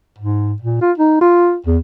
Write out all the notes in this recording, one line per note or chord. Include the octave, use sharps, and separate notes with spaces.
G#2
A#2
F4
D#4
F4
E2